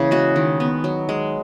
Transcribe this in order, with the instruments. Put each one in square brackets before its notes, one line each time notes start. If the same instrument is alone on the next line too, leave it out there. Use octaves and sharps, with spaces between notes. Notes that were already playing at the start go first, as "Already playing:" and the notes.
Already playing: [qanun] C#3 E3 A#3 G#4
G#3 F#4
D#3
B3
F#3
G#3